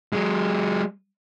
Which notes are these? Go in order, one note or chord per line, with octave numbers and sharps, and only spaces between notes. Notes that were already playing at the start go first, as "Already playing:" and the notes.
F#3 G#3